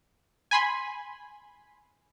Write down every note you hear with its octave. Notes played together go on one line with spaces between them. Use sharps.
G#5 B5 C6